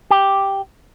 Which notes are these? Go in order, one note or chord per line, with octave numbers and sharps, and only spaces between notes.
G4